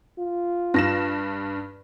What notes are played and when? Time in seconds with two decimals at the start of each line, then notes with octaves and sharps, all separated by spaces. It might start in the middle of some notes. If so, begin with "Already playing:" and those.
0.18 F4
0.74 G2 A#6 E7